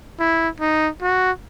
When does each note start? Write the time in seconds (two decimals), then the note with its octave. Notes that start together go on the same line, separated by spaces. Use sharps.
0.20 E4
0.60 D#4
1.02 F#4